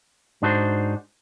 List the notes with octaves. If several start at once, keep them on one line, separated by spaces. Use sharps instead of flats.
G#2 D4 D#4 F#4 A4 C5